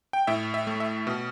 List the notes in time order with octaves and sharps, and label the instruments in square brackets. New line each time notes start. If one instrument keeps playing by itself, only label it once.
[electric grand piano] G5
A2 E5
E5
A3
E5
B2